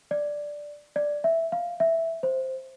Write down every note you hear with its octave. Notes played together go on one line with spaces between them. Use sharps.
D5
D5
E5
F5
E5
C5